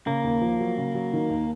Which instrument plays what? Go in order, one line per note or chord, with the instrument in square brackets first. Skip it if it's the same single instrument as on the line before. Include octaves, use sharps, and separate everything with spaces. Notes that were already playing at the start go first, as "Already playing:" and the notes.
[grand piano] C#3 [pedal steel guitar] A#3
[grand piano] D#2
F3
F#3
C#3
F#3
D#3
D#2